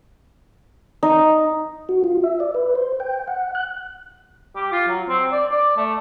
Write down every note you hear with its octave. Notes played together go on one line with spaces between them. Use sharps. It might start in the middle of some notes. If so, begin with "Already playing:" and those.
D#4
F#4
F4
E5
D5
B4
C5
G5
F#5
F#6
G4
F4
F#3
C4
D5
D5
A3